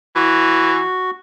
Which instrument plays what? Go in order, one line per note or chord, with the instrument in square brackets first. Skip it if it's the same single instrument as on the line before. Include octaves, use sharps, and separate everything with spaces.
[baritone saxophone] E3 [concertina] F#4